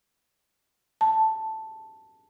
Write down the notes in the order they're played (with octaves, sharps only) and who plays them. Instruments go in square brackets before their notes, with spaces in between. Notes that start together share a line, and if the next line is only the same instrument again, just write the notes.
[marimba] A5